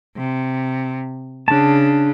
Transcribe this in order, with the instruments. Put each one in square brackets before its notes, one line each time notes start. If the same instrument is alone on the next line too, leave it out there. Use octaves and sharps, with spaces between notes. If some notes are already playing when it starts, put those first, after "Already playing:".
[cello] C3
[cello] C#3 [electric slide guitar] D4 A5